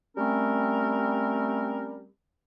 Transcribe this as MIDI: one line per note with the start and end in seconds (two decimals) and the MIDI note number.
0.18 2.07 55
0.18 2.07 57
0.18 2.07 60
0.18 2.07 61
0.18 2.07 70